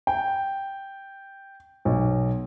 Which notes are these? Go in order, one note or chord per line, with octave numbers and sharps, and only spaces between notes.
G5
B1